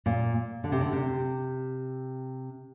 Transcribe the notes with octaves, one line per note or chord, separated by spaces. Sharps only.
A#2
D3
C3
D3
C3